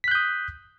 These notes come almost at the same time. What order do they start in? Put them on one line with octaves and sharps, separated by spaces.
B6 F#6 G6 D#6